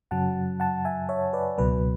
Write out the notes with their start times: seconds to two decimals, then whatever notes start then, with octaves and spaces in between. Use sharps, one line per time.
0.11 F#2 C#3 F#3 F#5 A5
0.60 F#5 A5
0.85 E5 G#5
1.09 C#5 E5
1.33 B4 D5
1.58 C#2 B2 F#3 B4